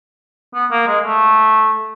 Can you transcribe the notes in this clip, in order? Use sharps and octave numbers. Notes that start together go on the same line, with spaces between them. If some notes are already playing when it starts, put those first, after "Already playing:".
B3
A#3
G#3
A3